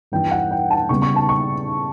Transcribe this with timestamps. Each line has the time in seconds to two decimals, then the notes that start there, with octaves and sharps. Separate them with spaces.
0.12 G2 E3 G3 G5
0.32 F#5
0.51 G5
0.71 A5
0.89 C#3 G3 B3 C#6
1.02 C#6
1.16 A5
1.29 C#6